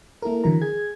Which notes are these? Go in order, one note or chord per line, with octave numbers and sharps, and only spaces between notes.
A#3 E4 A4 A#4
D3 E3 F#3 A#4 A#5
G#4 G#6